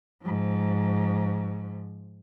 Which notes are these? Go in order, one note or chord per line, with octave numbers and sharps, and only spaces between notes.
G#2 F3